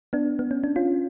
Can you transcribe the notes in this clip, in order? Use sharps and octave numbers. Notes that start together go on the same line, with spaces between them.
B3 D4
B3
C#4
D4
C#4 F4